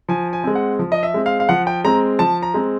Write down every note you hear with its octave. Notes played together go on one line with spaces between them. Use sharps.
F3 G#5
G#5
G#3 C4
F#5
F3
D#5
E5
G#3 C4
F5
F5
F3 F#5
G5
G#3 C4 A#5
F3 A5
A#5
G#3 C4